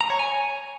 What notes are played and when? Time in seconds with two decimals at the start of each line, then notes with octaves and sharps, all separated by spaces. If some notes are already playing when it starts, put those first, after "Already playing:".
0.01 A#5
0.10 C#5
0.19 G#5